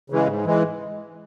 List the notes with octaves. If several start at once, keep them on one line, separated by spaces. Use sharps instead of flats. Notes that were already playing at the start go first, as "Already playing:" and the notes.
C#3 E3 G#3
G#2
E3 G#3